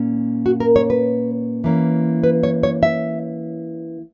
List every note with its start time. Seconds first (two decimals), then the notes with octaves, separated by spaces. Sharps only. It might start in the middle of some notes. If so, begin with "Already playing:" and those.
Already playing: A#2 A#3 C#4
0.46 F#4
0.60 A#4
0.76 C#5
0.90 B4
1.64 E3 A#3 C#4
2.24 B4
2.43 C#5
2.63 C#5
2.83 E5